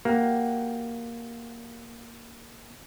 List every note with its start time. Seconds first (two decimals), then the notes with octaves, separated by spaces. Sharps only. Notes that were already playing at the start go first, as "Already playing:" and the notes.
0.05 A#3 F#4 G4 G5